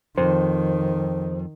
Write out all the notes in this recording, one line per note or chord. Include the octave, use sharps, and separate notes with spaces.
F2 D#3 C5